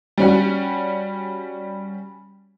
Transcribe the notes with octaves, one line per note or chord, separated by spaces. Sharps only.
G3 C#4 F#4